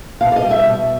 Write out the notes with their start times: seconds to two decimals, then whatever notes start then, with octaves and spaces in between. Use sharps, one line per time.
0.21 B2 F5
0.32 D5
0.36 D#5
0.43 G3
0.51 E5
0.66 B2